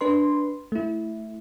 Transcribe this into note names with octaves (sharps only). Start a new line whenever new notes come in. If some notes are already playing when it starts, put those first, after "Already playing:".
D4 B4 C6
A3 E4